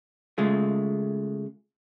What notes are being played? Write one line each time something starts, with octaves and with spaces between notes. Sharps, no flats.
C#3 G#3 A3 F4